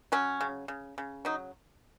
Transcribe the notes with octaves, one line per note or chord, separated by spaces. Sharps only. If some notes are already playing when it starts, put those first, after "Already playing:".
F#3 C#4
C#3
C#3
C#3
F#3 D#4